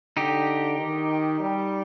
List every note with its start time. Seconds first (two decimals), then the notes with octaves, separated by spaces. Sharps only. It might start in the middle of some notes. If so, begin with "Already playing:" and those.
0.17 D3 D#4 G4
0.78 D#3
1.39 G3